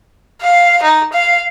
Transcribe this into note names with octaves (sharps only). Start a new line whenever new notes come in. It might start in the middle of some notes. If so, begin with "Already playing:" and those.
F5
D#4
F5